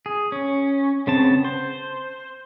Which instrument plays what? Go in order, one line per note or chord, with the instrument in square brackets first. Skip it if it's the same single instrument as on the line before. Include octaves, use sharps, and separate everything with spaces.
[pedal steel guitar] G#4
C#4
C#3 B3 C4 A5
C5